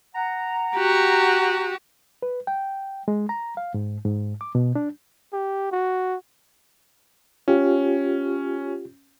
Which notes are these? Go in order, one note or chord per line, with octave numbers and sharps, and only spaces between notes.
F#5 A#5
F#4 G4
B4
G5
G#3
A#5
F5
G#2
G#2
D6
B2
D4
G4
F#4
C#4 F4 G4